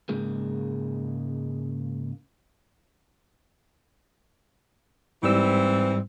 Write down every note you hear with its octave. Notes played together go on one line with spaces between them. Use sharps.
G#2 C#3 G#3 A#3
G#2 E3 G3 C4 E6